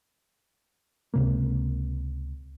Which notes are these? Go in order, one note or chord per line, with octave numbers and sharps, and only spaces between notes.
C#2 C3 A#3